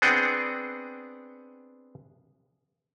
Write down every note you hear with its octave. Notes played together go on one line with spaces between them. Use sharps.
B3 C4 D4 G#4 F#5 G5